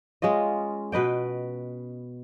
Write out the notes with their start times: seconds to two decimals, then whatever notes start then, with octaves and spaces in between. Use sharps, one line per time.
0.22 G#3 C#4 F4 D#5
0.92 B2 B4 D#5 G5